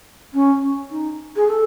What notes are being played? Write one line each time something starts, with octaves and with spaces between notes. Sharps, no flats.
C#4
D#4
G#4
A4